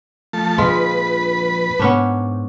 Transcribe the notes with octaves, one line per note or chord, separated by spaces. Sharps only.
F3 A3 A5
F2 A#2 F3 G#3 F4 B4
G#2 B3 C#4 D4